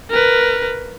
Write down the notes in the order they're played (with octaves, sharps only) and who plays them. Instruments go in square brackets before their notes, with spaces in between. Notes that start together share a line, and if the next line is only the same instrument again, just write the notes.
[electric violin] A#4 B4